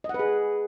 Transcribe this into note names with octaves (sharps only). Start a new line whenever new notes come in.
D#5
F#5
B4
G#4